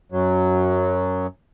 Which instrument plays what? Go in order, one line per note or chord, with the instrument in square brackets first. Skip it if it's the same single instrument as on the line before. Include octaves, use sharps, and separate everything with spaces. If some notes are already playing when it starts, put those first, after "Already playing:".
[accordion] F#2 F#3